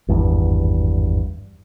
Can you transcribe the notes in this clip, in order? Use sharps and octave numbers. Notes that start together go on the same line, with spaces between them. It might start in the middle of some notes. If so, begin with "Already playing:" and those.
G#1 E2 G2